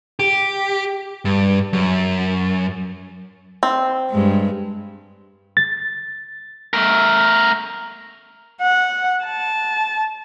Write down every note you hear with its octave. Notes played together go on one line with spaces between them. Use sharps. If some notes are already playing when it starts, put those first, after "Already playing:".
G4
G2
F#2
C4
G2 G#3
A6
A3 A#4
F#5
A5